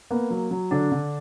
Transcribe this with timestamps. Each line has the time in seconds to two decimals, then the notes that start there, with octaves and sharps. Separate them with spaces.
0.11 A#3 B3
0.31 F#3
0.51 F#3
0.71 D3 D4
0.92 D3